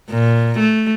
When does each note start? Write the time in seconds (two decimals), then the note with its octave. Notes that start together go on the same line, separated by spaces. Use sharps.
0.10 A#2
0.59 A3